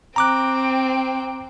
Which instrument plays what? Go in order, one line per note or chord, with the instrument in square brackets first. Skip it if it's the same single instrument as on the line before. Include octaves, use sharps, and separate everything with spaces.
[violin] C4 G5 [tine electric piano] A#5 D6 F#6